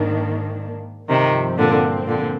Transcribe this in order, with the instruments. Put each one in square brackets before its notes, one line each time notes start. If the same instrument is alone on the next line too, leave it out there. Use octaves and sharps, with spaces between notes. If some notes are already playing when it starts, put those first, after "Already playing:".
Already playing: [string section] G#2 D#3 A#3 D4
[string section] G2 F3 C4 [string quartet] C3 D#3
[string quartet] A#2 D3
A#2 D3